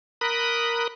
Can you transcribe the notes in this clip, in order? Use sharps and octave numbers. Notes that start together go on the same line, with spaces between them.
A#4 B5 D#6 F#6